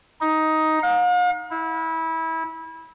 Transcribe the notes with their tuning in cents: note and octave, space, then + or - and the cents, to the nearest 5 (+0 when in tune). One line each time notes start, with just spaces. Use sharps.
D#4 +10
F5 +45
E4 -25